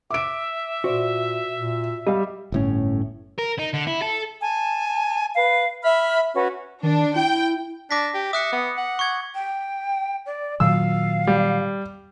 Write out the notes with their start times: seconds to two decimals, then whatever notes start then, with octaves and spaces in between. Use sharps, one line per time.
0.11 E5 D6 D7
0.84 A#2 F#4 C5 D5
1.55 A#2
2.07 G3 D#5 F5
2.52 G1 A2 C#4
3.38 A#4
3.59 D#4
3.73 D3
3.87 E4
4.02 A4
4.40 G#5 A5
5.35 B4 F5
5.83 E5 B5 F6
6.34 C#4 F#4 B4
6.83 D#3 D4
7.16 E4 G5
7.91 D4 D6 A#6 B6
8.14 G4
8.33 E5 D#6 F#6 C#7
8.52 B3
8.78 F#5
8.99 C#6 G#6
9.35 G5
10.26 D5
10.60 A#2 D#3 F#3 F5 E6
11.27 G3